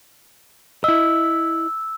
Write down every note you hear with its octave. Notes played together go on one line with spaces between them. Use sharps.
E4 D#5 E6